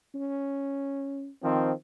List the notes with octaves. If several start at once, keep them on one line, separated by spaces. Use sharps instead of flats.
C#4
D#3 F3 C4